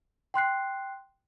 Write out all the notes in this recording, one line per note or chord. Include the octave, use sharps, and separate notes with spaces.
G5 C6 F#6 C7